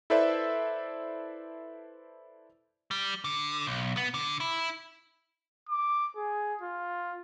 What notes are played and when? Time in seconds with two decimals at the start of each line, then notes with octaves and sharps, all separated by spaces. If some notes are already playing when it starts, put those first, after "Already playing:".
0.10 E4 A4 B4 C5 D5 E5
2.91 G3
3.24 D3
3.67 B1
3.97 B3
4.14 D3
4.40 E4
5.69 D6
6.16 G#4
6.62 F4